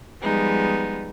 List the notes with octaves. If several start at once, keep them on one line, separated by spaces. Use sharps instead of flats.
F3 G3 G#3 B3 D#4